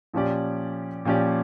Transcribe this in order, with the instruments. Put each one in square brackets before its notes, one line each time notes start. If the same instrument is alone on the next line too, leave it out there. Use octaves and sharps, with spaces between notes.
[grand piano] A#2 F3 C#4 G4 D5
A#2 F3 C#4 G4 D5